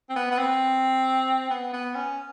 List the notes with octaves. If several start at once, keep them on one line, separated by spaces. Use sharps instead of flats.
C4
B3
B3
C4
B3
B3
C#4